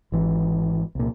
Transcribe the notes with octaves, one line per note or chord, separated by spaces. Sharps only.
G#1 E3
C2 A#2